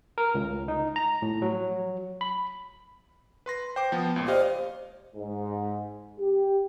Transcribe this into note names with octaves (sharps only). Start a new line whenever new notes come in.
A#4
C#2
D#4
A#5
A2
F#3
B5
B4 C6 A#6
C5 G5 D6
F3 B3
C#2 A#2
G4 C5 D5 D#5 F5
G#2
G4